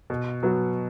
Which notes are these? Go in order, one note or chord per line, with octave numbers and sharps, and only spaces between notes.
B2
F#3 B3 F#4